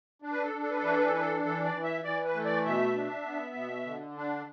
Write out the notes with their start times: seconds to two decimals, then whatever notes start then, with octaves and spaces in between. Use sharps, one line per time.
0.22 D4
0.32 B4
0.43 A4
0.53 D4
0.63 A4
0.70 B4
0.77 A4
0.83 E3 B4
0.92 A4
0.99 B4
1.05 A4
1.13 D4 B4
1.20 A4
1.44 E3 A4
1.64 D5
1.74 E3
1.84 E5
2.04 E3 D5
2.24 B4
2.35 A3
2.45 D5
2.65 B2 E5
2.95 D4
3.25 B3
3.55 B2
3.86 D3
4.17 D4